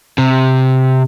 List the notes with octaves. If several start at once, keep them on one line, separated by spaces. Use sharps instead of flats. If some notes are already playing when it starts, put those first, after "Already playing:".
C3